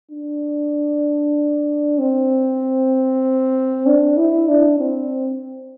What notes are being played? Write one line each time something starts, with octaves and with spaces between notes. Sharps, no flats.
D4
C4
D4
E4
D4
C4